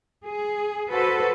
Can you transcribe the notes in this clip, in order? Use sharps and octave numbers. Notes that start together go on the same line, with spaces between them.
G#4
F#4 A4 B4 C5